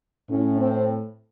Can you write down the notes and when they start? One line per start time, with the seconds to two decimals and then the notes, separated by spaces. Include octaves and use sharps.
0.30 A2 C#4
0.59 C4